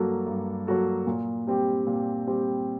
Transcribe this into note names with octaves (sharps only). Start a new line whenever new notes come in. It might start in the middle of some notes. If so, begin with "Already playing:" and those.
Already playing: G2 F#3 A#3 F#4 A4
G2
F#3 A#3 F#4 A4
A#2
G3 C4 G4
A#2
G3 C4 G4